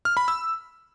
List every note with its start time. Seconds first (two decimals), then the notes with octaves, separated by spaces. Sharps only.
0.05 F6
0.17 B5
0.28 E6